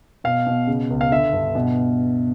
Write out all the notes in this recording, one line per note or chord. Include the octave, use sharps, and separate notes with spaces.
B2 F5
B2
C#3
C#2
F5
D3 E5
G2
B2